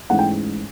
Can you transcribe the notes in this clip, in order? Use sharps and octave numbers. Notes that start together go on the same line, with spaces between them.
G#2 E3 A3 C#4 F#5
G5